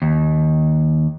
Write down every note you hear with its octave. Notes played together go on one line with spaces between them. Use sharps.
D#2